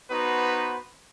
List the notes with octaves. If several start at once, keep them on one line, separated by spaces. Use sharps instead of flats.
B3 D#4 F#4 B4 C5